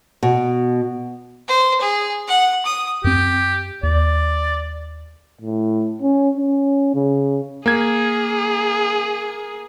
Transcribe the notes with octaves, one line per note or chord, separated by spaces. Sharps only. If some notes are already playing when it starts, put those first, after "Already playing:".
B2
C5
G#4
F#5
D#6
F#2 C4 G4
D#2 D5
A2
C#4
C#4
C#3
A#3 G#4 G#6